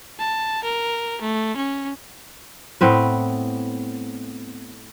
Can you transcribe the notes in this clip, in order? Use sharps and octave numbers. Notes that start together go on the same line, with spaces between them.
A5
A#4
A3
C#4
A2 B3 C4 B4